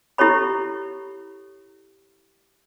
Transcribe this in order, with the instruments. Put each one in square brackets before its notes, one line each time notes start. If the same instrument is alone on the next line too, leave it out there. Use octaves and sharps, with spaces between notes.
[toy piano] E4 G4 A4 C#5 B5